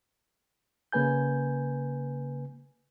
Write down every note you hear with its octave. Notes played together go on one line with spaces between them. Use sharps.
C#3 A#3 B4 G#5 G6